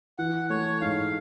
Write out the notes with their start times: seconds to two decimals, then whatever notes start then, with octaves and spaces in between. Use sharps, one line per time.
0.18 E3 F#5
0.50 A3 C#5
0.81 G#2 F5